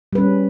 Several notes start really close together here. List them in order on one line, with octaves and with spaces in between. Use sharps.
G3 B4 C#4